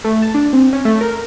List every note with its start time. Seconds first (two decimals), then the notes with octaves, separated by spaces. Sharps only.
0.04 A3
0.22 A5
0.34 D4
0.53 C4
0.73 C#4
0.85 A3
1.01 A#4